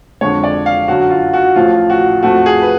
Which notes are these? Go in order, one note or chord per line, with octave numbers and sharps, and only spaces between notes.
F2 D3 G#3 C#5
D5
F5
F#2 D3 F#3 F#4
F4
F#4
A1 A2 F3 F4
F#4
F2 F3 A3 F#4
G#4
B4